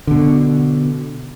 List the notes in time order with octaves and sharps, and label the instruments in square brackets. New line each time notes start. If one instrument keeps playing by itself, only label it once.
[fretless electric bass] B2 D3